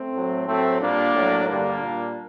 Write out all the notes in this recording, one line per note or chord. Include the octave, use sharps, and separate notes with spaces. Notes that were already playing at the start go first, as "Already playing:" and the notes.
Already playing: A3 C4
A2 F#3
A2 F#3 A3 C4
A#2 G3 A#3 D4
A2 F#3
G2 D3 G3 A#3 D4
A#2 G3